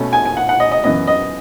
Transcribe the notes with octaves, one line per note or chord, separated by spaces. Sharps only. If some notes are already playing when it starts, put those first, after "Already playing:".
Already playing: B2 A3 C#4
G#5
G#5
F#5
F#5
D#5
D#5
F#2 E3 B3 D#5
D#5